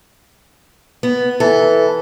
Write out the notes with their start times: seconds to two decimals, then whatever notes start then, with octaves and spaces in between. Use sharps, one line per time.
1.03 B3
1.40 E3 A4